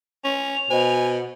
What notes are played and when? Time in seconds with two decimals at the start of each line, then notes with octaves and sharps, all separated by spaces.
0.24 C#4 F7
0.70 B2 C5 D#5 G#5